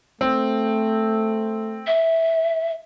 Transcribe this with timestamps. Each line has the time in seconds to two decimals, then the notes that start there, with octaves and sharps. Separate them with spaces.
0.21 A3 C4
1.87 E5